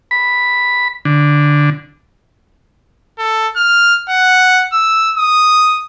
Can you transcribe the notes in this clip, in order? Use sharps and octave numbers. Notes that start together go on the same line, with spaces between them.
B5
D3
A4
F6
F#5
E6
D#6